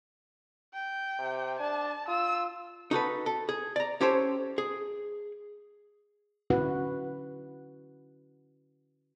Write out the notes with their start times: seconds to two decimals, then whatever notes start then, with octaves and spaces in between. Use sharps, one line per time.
0.74 G5
1.19 C3
1.60 D4 A5
2.08 F4 E6
2.91 D#4 F#4 A4 B4
3.26 A4
3.49 G#4
3.76 D5 A#5
4.01 C#4 G4 A4 C5 C#5
4.58 G#4
6.50 D3 C#4 E4 F#4 B4 F#5